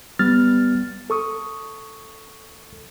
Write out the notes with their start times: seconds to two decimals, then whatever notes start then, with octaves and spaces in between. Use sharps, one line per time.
0.19 G3 B3 F6 A6
1.10 A4 C#6 D#6